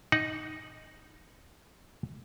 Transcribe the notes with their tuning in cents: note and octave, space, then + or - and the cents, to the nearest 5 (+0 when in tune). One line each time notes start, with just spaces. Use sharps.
D#4 +0 F#5 +0